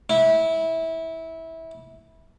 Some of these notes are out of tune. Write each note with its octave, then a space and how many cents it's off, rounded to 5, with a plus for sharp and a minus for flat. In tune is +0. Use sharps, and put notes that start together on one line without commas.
E4 -20